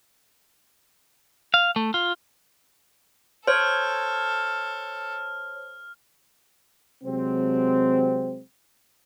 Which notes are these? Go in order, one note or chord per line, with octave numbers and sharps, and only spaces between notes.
F5
A3
F4
A4 C5 C#5 F6
C3 F#3 G#3 C4